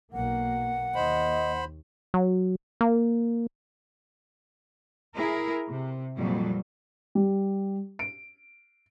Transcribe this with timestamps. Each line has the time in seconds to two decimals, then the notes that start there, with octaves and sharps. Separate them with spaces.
0.13 B1 A#3 F#5
0.95 D#2 C5 D#5 B5
2.14 F#3
2.81 A#3
5.16 E4 G#4 A#4
5.69 C3
6.16 F2 A#2 F#3 G3
7.15 G3
7.99 D7